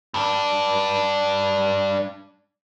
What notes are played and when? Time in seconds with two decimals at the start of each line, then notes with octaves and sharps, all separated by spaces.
0.14 G2 D4